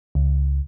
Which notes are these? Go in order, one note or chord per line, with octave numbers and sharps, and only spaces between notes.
C#2